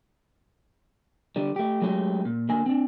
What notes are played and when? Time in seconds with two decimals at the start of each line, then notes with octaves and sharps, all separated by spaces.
1.36 D3 G3
1.56 A3 G4
1.82 F#3 G#3 A3 C#4 G4
2.25 A#2
2.49 D3 A#3 G#5
2.66 C4 D4